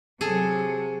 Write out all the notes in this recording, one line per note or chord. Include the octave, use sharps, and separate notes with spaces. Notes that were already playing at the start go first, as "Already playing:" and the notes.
C3 F#3 G#4 A4